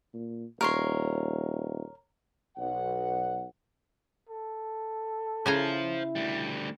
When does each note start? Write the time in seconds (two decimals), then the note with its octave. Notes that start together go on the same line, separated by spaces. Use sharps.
0.14 A#2
0.61 D#1 A#4 C#5 C6
2.57 B1 F#5
4.29 A4
5.46 C#3 E4 C5 F5 G#5 A#5
6.15 D2 G3